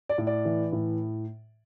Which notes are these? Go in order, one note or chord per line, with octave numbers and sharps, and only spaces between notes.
D5
A2
D5
E3
A2